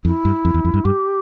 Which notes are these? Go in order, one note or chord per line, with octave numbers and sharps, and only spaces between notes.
F2 E4
G2
F2
E2
F2
G2
G2 G4